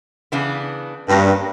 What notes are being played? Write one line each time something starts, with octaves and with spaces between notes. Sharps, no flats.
C#3 E3 B3 D4
G2 A#3 C#4 F#4 B4